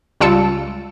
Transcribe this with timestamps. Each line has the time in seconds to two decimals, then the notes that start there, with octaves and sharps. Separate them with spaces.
0.20 C#2 G3 F4 A5 E6 C#7